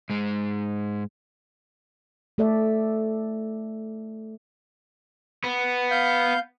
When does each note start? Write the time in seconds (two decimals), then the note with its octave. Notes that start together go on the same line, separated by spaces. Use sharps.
0.09 G#2 G#3
2.38 A3 A4 D5 E5
5.44 B3
5.91 F5 G6